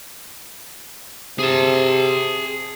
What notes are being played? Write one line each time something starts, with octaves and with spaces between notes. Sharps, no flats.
C3 G#4 A5